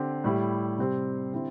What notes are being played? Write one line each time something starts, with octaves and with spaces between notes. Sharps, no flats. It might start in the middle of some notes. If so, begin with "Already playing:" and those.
Already playing: D3 C4 G4
A2 G3 E4 G4
C3 G3 C4 G4
D3 C4 E4 G4